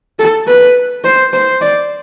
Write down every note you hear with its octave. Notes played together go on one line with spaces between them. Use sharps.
A4
B4
C5
C5
D5